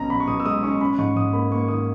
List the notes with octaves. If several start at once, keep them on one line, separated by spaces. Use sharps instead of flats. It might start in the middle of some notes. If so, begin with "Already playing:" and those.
Already playing: B1 C#4 A#5
B1 B5
C#6
B1 D#6
E6
G#3 D#6
C#4 C#6
C#4 B5
G#2 C#6
G#2 D#6
A#3 B5
A#3 C#6
D#3 D#6